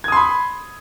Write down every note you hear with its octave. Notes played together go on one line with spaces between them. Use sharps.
B5 C6 D#6 G#6